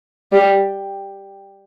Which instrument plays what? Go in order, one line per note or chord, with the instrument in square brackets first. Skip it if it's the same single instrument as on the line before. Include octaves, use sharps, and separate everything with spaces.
[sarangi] G3